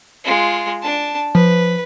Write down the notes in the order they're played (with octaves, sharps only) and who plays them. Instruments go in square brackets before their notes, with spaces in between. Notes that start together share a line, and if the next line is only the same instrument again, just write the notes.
[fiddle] G#3 F4
D4 A5
[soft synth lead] F3 [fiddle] B4